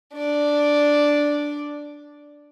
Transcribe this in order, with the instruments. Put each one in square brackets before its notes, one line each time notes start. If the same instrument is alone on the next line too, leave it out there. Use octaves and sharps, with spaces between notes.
[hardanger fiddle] D4 D5